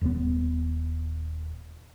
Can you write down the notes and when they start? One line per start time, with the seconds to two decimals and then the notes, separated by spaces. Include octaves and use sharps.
0.01 D#1 B3